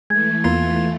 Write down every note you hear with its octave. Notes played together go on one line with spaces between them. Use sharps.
E3 G#3 A3 G#6
E2 A#3 B3 F4